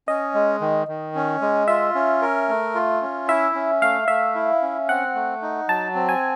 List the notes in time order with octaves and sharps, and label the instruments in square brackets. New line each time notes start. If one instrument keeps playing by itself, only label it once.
[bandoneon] C#4 [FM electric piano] D#5
[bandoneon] G#3
D#3
D#3
C#4
G#3
[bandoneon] F4 [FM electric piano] E5
[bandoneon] C#4
A#4
A3
F4
C#4
[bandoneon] E4 [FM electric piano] E5
[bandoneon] C#4
[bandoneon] A3 [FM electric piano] F5
[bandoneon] A3 [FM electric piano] E5
[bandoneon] E4
C#4
[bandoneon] C4 [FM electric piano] F#5
[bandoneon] A3
D#4
[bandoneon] F#3 [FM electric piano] A5
[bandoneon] C4
[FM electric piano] G#5